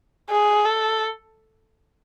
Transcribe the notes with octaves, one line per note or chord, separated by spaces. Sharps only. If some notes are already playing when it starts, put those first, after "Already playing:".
G#4
A4